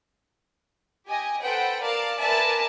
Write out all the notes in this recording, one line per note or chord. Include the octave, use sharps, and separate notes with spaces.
G4 D#5 G#5
A4 B4 C5 F#5 G5
A#4 D5 F5 A5
A#4 B4 D5 E5 G#5 A5